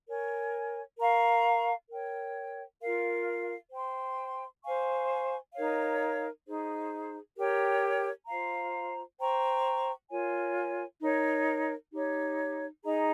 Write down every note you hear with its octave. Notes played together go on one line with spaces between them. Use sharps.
A#4 C#5 G#5
A#4 F5 A#5 C#6
A#4 C#5 G5
F4 A#4 F5
C5 G5 C6
C5 F5 G#5 C#6
D#4 A#4 C#5 F5
D#4 G#4 C5
G4 A#4 C#5 G5
F4 C5 F5 A#5
C5 G5 A#5 C#6
F4 A#4 C#5 G#5
D#4 A#4 C#5
D#4 G4 C#5
D#4 G#4 D#5 A#5